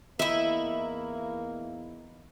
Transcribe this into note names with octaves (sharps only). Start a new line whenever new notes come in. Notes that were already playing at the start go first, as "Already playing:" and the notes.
E2 A#3 D#4 E4 E5